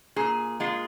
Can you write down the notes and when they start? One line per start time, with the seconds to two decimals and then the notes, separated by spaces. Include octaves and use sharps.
0.16 A#2 G#4
0.60 G#3 F4